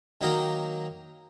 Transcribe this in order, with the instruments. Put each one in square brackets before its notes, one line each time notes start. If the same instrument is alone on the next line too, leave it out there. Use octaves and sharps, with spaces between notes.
[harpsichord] D#3 F#3 A#3 D#4 A#4 G5